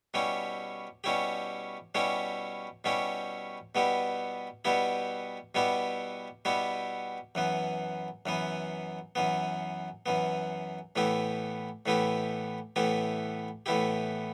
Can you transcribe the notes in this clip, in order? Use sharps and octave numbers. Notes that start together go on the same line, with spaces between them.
B2 G3 C#4 E4 G4
B2 G3 C#4 E4 G4
B2 G3 C#4 E4 G4
B2 G3 C#4 E4 G4
B2 G3 B3 E4 G4
B2 G3 B3 E4 G4
B2 G3 B3 E4 G4
B2 G3 B3 E4 G4
F#2 E3 B3
F#2 E3 B3
F#2 E3 B3
F#2 E3 B3
A2 E3 B3 E4 G4
A2 E3 B3 E4 G4
A2 E3 B3 E4 G4
A2 E3 B3 E4 G4